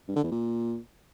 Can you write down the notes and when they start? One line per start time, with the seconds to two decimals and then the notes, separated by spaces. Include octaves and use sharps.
0.08 G2
0.16 D3
0.24 E2
0.31 A#2